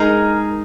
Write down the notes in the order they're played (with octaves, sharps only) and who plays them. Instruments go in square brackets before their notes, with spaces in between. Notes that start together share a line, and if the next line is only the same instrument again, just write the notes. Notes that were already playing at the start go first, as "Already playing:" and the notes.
Already playing: [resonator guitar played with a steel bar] G#3 D#4 G#4 [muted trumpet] A#4